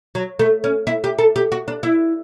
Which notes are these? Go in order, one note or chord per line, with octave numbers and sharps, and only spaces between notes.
F#3
A3
C#4
E4
G4
A4
G4
F#4
D4
E4